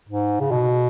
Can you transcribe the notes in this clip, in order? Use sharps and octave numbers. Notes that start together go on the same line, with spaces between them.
G#2
C#3
B2